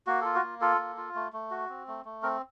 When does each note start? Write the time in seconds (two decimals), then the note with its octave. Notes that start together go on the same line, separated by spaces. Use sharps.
0.07 A#3 F#4
0.21 F4 A4
0.35 F#4
0.42 A#3
0.61 F4 A4
0.78 A#3
0.97 F4
1.15 A3
1.33 A3
1.51 F#4
1.69 C4
1.88 A3
2.05 A3
2.23 C4 A#4